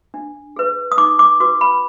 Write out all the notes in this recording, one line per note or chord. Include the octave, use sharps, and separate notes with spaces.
D4
G#4 B4
D#6
D#4 D6
D6
F#4 B4 D6
B5